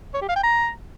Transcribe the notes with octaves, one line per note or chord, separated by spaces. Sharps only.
C#5
G4
F5
G5
A#5